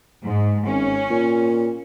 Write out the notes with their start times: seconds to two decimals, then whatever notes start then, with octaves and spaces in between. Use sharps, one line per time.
0.25 G#2
0.66 G#1 C#4
1.10 A#2